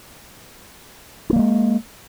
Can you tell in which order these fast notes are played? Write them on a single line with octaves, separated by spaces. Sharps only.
D4 A#3 G3 G#3